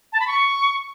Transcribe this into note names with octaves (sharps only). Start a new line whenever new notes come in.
A5
B5
C#6